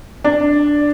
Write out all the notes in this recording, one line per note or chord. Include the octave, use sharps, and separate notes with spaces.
D4